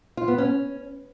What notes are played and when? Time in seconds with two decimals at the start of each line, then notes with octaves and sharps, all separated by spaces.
0.17 F4
0.28 B3
0.38 C#4